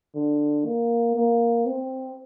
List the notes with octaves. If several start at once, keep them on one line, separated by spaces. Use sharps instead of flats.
D3
A#3
A#3
C4